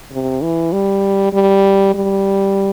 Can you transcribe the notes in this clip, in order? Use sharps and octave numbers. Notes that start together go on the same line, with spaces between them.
C3
E3
G3
G3
G3